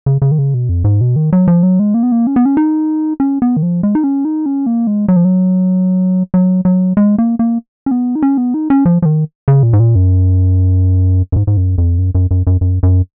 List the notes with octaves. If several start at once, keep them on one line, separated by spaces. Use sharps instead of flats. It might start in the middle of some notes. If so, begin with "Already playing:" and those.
C#3
C#3
D#3
C#3
B2
F2
G#2
B2
D#3
F#3
F3
F#3
G#3
A#3
B3
A#3
C#4
B3
C#4
D#4
C#4
B3
D#3
F3
G#3
D#4
C#4
D#4
C#4
A#3
G#3
F#3
F3
F#3
F#3
F#3
G#3
A#3
A#3
C#4
B3
D#4
C#4
B3
D#4
C#4
F3
F3
D#3
C#3
A#2
G#2
A#2
F#2
F#2
G#2
G#2
F#2
F2
F#2
F#2
F#2
F#2
F#2
F#2